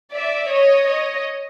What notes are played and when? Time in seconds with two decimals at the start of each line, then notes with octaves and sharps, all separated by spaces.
0.13 D5 E5
0.49 C#5 D#5
0.86 C#5 D#5